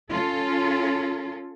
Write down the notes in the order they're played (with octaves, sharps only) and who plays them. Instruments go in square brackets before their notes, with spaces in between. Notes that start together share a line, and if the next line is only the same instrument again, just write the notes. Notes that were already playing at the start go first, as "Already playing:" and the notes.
[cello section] C#4 F4 A4